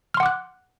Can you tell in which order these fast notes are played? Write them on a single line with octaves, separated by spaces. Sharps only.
F6 C6 F#5 D6 F#6